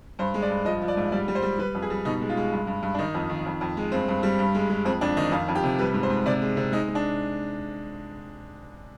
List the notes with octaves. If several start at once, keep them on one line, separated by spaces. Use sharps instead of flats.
G2 C5
G#3
D5
G2
F3 D#5
F3
D5
G#2
G3 D5
G3
C5
G3
G3 B4
F2
G#4
G3
B2 D#4
G#3
F4
G#3
G2
G2
G2
D4
D#3 D#4
F2
D#3
F2
F2
G#3
G2 C4
G2
G3
G2
G#3
G#3
F2 C4
F2 D4
D#3 D#4
F2 F4
F2
G4
C3
G3 B4
G#2
C5
G#2
C3 D5
G#3
C3
G#3 D#4
G#3
D4